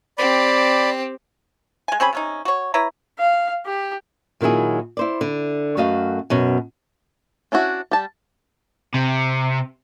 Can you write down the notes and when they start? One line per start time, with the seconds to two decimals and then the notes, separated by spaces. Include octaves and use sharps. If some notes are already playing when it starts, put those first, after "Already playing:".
0.18 C4 G4 D5 B5
1.88 G#3 G#5
2.00 C4 C#4 G#4 B5
2.13 C3 C#4 D#4
2.45 F#4 C#5
2.74 E4 B4 C#5 A#5
3.19 F5
3.66 G4
4.41 A#2 D#3 F#3 E4 G#4
4.97 E4 C5 D5
5.21 D3
5.77 F#2 A3 F#4 D#5 F5
6.30 F#2 B2 C#5
7.52 C#4 D4 E4 F#4
7.91 G3 A5
8.94 C3